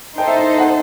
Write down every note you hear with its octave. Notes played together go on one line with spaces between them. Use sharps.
D#4 A4 C5 G5
E5
E5
F#5